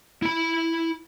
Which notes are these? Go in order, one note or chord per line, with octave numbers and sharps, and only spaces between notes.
E4 B5